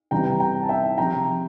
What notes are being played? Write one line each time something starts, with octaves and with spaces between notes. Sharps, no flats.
C3 E3 G3 G5 A#5
G5 A#5
A5
E5 G5
C3 F3 G5 A#5